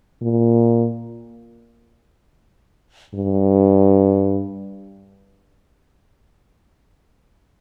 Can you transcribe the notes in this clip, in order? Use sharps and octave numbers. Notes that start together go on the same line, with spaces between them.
A#2
G2